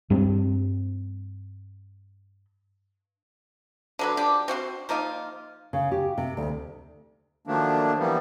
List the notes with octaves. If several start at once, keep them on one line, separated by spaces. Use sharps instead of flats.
G2 G3 C4
D3 F#3 B4
F3 D4 G4
C4 F#4 F5 C6
F3 A#3 D#4 F4
C#3
G4
C3
D2
D#3 F3 F#3 A3 A#3 D4
E3 F3 G3 A#3 B3